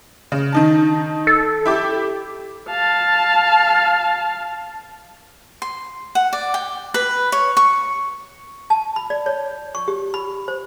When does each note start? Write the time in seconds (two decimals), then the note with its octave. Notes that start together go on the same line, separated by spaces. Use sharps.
0.32 C#3
0.53 D#3 D#4 A5
1.27 A4
1.66 E4 G4 D6
2.70 F5 A5
5.62 C6
6.15 F#5
6.33 D5
6.54 G5
6.94 B4
7.32 C#5
7.57 C#6
8.70 A5
8.96 B5
9.10 D5
9.26 C#5
9.75 C#6
9.88 G4
10.14 B5
10.48 C5